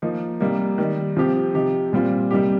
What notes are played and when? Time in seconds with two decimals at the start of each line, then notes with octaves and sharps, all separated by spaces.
0.02 F3 A#3 D#4
0.41 C3 G3 A#3 D#4
0.78 D#3 G3 D#4
1.17 C3 F3 C4 G4
1.54 C3 F3 D#4 G4
1.92 A#2 G3 C4 F4
2.31 C3 G3 A#3 D#4 G4